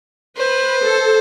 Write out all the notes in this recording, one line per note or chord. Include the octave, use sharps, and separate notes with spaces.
B4 C5
A4